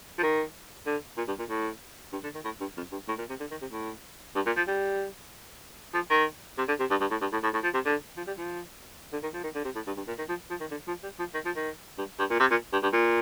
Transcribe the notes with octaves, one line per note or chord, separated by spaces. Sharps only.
F3
D#3
D3
A#2
G2
A#2
A2
G2
D3
D#3
A2
G2
F2
G2
A2
A#2
C3
D3
D#3
C3
A2
G2
A#2
F3
G3
F3
D#3
C3
D3
C3
G2
G2
A2
G2
A2
A2
A2
F3
C3
D3
F3
G3
F3
D3
D#3
F3
D#3
D3
C3
A2
G2
G2
A#2
D#3
F3
F3
D#3
D3
F3
G3
F3
D#3
F3
D#3
G2
G2
A#2
C3
A#2
G2
G2
A#2